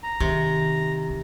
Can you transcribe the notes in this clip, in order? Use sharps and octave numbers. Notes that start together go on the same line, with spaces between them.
A#5
C3 D#3
E3